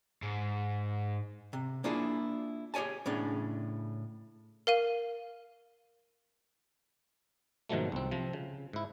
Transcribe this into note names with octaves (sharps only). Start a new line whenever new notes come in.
G#2
C3
A#3 D4 E4 F4 G#4
G4 G#4 C#5 G#5 A5
A2 C#3 C#4 D4
A#4 F5 D#7
G#2 B2 D#3 F3 F#3 A3
C2 C4
C3 F3
C#3
G#2 E4